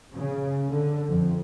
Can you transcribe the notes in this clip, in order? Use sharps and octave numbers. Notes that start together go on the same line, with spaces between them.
C#3
D3
F2